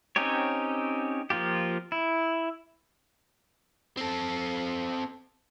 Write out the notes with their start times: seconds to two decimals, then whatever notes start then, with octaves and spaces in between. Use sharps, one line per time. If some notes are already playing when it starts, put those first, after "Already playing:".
0.16 C4 C#4 D#4 G4 C#5
1.30 F3 A#3 F4 G4
1.92 E4
3.97 C4 A4